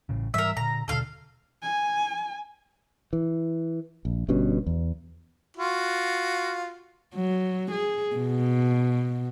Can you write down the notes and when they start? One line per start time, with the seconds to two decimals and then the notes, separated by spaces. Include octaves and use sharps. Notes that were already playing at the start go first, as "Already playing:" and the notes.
0.09 A1 A2 C#3
0.34 G#2 E3 G3 A#4 E5
0.57 A#2 D3 A#5
0.88 D#1 B2 D3 A4 F5
1.62 G#5
3.13 E3
4.05 A#1
4.28 G1 G2 B2 C#4
4.66 E2
5.57 F4 F#4
7.15 F#3
7.71 G#4
8.17 B2